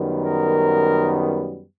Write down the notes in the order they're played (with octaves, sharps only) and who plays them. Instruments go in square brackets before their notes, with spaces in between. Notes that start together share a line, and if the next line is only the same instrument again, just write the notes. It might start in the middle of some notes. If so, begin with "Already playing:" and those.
Already playing: [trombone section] F#2 D#3 G3 B3
A#4